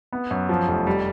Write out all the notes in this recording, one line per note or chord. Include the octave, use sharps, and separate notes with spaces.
B3
F#2
F3
F1
G3